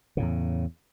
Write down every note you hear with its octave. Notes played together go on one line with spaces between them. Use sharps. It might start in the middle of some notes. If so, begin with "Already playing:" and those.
E2 A2 C#3